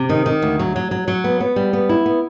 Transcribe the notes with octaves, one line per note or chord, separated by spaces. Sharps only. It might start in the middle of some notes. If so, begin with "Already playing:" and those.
Already playing: C3
D#3
D#3
D2
F#3
F#3
F#3
F#3
B3
B3
G3
B3
E4
B3